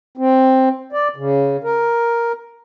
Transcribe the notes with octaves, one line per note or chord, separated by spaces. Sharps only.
C4
D5
C#3
A#4